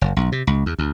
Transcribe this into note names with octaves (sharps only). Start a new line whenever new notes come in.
F#1
B1
C3
C#2
E2
D2